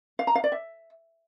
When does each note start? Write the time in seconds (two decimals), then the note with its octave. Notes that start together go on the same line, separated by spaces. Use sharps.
0.19 F5
0.27 A#5
0.35 F5
0.44 D5
0.52 E5